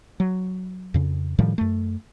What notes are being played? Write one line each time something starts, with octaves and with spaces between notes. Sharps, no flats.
F#3
F2 C#3
A2 D#3 F3 G3
F#2 A3